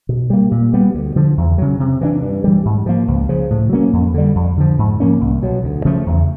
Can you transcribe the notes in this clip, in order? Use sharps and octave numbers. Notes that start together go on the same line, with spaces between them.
B2
G3 A#3
A#2
G3 B3
D2
D3 F3
E2
C#3 F#3
C3
E3 A3 D4
G2
E3 G3
G#2
F3 A#3
C#2
C#3 F3
A2
F#3 A#3 C#4
F2
D3 G3
F2
D3 F3
G#2
F3 A#3 C#4
C2
B2 F#3
D2
C#3 F3 A3
E2